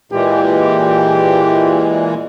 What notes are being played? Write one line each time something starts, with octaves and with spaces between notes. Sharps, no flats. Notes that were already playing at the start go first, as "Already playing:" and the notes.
A#2 E3 G#3 G4